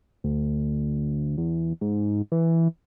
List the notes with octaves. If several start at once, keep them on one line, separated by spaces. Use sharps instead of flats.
D2
E2
G#2
E3